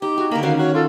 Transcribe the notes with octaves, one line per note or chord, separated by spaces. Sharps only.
D#4 G4
F#4 G#4
D3 A#3 A#5 B5
D#3 C#4 F#4 F5
F#4 C#5
F4 A4